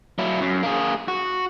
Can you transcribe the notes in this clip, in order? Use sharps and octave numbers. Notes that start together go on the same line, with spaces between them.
F#3 E4
F#2
A#3 G#4
F#4